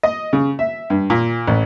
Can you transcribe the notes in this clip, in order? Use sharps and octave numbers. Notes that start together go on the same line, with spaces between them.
D#5
C#3
E5
G2
A#2
A1